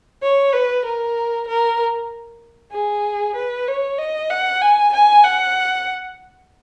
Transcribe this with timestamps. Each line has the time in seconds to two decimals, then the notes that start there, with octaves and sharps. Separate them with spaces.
0.22 C#5
0.52 B4
0.85 A#4
1.47 A#4
2.72 G#4
3.35 B4
3.67 C#5
3.98 D#5
4.30 F#5
4.61 G#5
4.93 G#5
5.24 F#5